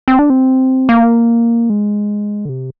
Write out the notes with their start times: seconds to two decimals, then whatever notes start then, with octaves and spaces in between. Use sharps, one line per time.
0.08 C4
0.19 D4
0.30 C4
0.89 A#3
1.70 G#3
2.45 D3
2.49 C3